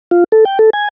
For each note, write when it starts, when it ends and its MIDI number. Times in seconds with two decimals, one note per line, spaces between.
0.11 0.24 65
0.32 0.44 69
0.45 0.59 79
0.59 0.70 69
0.73 0.88 80